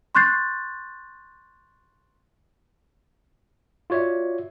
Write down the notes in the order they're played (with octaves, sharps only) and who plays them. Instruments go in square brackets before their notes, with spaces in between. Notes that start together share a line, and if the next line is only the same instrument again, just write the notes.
[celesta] C6 C#6 F#6 G6 A6 C7
[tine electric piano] F4 F#4 C#5 D5 E5